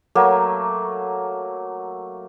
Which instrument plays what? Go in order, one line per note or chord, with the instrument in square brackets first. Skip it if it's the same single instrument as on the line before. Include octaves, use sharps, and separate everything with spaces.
[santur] F#3 A3 A#3